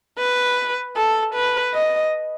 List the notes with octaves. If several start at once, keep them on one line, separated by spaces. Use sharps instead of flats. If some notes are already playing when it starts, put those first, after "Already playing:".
B4
A4
B4
D#5